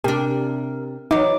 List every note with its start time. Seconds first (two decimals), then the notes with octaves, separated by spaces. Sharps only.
0.04 C3 D4 G4 A#4
1.11 E3 F#3 D#4 F#4 D6